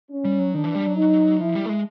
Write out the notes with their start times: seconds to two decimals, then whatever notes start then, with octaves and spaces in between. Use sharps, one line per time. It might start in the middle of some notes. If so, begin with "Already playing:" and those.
0.10 C#4
0.25 G3
0.39 F#3
0.54 D#3 D4
0.64 E3
0.75 G3
0.86 F#3
0.96 D#4
1.40 F3 E4
1.55 G3
1.66 A3
1.69 G#3